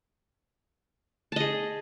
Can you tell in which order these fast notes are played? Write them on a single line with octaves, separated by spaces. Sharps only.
A5 D#5 G#4